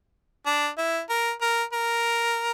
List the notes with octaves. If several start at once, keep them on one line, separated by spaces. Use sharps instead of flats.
D4
E4
A#4
A#4
A#4